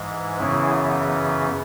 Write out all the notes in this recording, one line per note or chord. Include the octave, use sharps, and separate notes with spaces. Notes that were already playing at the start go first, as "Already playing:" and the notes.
Already playing: G#2 E3 G#3
F#2 C#3 E3 B3 E4 G#4